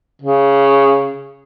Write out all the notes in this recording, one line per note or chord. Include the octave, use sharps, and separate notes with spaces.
C#3